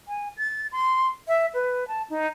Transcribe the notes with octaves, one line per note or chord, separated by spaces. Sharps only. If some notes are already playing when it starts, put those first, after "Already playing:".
G#5
A6
C6
E5
B4
A5
D#4